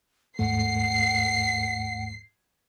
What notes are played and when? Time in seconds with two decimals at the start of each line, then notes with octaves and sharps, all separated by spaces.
0.39 D#2 G#2 A3 F#5 C7